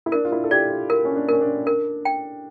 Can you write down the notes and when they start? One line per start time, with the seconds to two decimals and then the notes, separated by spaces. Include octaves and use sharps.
0.06 E4
0.12 D4 A#4
0.25 F4
0.32 E4
0.44 A4
0.51 G4 D5
0.70 F4
0.90 A#4
1.05 C#4
1.16 D4
1.29 C#4 A#4
1.41 D4
1.67 D4 A#4
2.05 G5